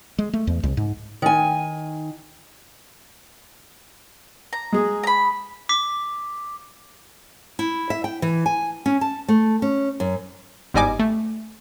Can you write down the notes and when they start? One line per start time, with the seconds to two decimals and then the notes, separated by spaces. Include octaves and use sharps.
0.19 G#3
0.33 A3
0.47 E2
0.63 C2
0.77 G#2
1.22 D#3 G#5
4.53 A#5
4.72 G#3 G#4
5.04 A#5 B5
5.69 D6 B6
7.59 E4
7.90 E5
8.04 G5
8.22 E3
8.46 G#5
8.86 C#4
9.01 A5
9.28 A3
9.62 C#4
10.00 F#2
10.74 G1 G#2 G3 D#5 G#5 D6
10.99 A3